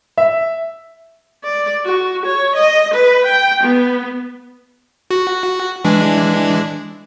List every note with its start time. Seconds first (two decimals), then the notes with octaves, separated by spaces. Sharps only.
0.18 E5
1.44 D5
1.85 F#4
2.25 C#5
2.55 D#5
2.94 B4
3.26 G5
3.63 B3
5.11 F#4
5.85 E3 G#3 D4